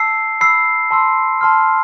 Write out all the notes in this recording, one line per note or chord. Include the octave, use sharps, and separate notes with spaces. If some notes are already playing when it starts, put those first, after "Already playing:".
Already playing: A5 E6 C7
B5 E6 C7
A5 C6 E6
A5 C6 F6